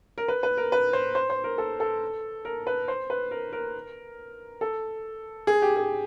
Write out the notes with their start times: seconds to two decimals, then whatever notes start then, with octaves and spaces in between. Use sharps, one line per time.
0.18 A#4
0.28 B4
0.43 B4
0.57 A#4
0.72 B4
0.93 C5
1.15 C5
1.30 C5
1.44 A#4
1.58 A4
1.80 A4
2.45 A#4
2.67 B4
2.88 C5
3.10 B4
3.31 A#4
3.53 A#4
4.61 A4
5.47 G#4
5.62 G4
5.76 G#4